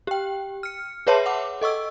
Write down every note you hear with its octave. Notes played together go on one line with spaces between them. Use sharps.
G4 G5
F6 C#7
G#4 B4 C#5 E5 A5 C6
F#5 D6
A4 D#5 C#6 E6